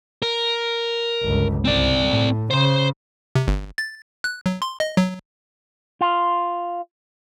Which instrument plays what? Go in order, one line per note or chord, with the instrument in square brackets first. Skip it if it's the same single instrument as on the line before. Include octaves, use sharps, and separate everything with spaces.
[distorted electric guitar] A#4
[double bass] G1 C#2
[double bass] C2 [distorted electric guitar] C4 D5
[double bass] A2
[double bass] C#3 [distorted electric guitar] C5 C6
[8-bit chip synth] C3
G1
A6
F#6
F#3
C6
D#5
F#3
[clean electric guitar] F4